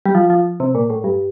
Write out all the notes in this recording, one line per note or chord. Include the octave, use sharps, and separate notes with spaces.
G3
F3
F3
C3
A#2
A2
G2